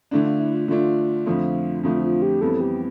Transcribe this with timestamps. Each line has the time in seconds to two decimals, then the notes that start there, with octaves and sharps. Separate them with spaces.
0.11 D3 A3 D4 E4
0.26 F4
0.40 E4
0.54 F4
0.68 D3 A3 D4 F4
1.26 F2 D3 F3 A3
1.83 F2 D3 F3 A3 F4
2.03 F4
2.22 G4
2.41 F2 E3 G3 B3 A4
2.60 G4